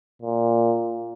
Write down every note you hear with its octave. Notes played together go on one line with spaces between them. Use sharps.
A#2